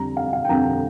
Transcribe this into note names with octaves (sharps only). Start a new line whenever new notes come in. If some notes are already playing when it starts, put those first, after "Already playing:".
Already playing: F2 D3 G3 A#5
F5
F5
G5
F2 D3 G3 A#5